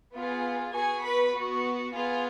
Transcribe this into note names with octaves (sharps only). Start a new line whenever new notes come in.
B3 F4 G#4
B3 F#4 G#4 G#5
B4 B5
B3 F#4
B3 F4 G#4